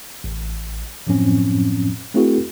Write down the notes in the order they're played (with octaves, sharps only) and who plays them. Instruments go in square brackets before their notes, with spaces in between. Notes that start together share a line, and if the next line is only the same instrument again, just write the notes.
[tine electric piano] A1
F#2 A2 F3 F#3 C4 C#4
A3 C4 E4 F#4 G#4 A#4